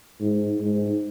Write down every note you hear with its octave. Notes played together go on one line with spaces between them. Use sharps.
G#2
G#2